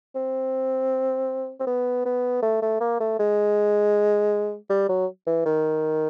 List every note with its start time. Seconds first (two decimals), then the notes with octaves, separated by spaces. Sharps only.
0.15 C4
1.60 C4
1.67 B3
2.05 B3
2.42 A3
2.62 A3
2.80 A#3
3.00 A3
3.19 G#3
4.70 G3
4.89 F#3
5.27 E3
5.46 D#3